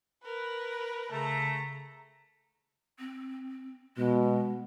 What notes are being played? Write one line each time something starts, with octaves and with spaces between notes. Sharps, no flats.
A#4 B4
C#3 A3 A#5
C4
B2 G#3